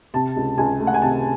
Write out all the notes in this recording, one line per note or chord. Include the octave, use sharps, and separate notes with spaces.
C3 A5
C#2
C#2 G#5
A3
F#5
G#5
C3 A5